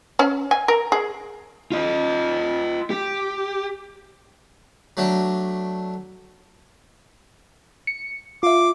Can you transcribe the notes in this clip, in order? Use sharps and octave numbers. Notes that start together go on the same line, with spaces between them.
C#4
G#5
A#4
G#4
F4 D#5
G4
F#3 A3 D4
C#7
F4 E5 D6